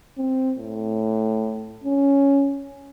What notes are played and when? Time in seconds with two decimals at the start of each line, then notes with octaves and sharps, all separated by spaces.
0.18 C4
0.59 A2
1.84 C#4